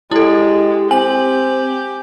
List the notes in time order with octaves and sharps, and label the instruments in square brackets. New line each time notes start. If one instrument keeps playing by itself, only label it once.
[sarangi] G#3 [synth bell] E4 A4 [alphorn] G4
[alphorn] C4 [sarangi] G4 [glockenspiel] G#5 [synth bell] F#7